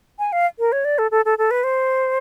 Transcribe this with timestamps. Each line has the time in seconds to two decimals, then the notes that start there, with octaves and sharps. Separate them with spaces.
0.19 G#5
0.32 F5
0.59 A#4
0.72 C#5
0.85 D5
0.98 A4
1.11 A4
1.25 A4
1.38 A4
1.51 B4
1.64 C5